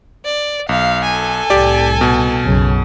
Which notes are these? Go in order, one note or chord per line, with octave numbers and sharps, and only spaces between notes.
D5
B1 F5
A4 G#5
C2 A2 G4 D5
B2
B1 F#2 C#3